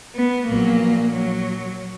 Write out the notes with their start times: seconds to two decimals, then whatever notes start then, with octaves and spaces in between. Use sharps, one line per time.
0.15 B3
0.47 A#1 A#2 F#3 A#3
1.12 F#3